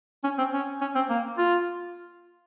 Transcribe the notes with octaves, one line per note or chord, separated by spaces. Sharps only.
C#4
C4
C#4
C#4
C4
A#3
F4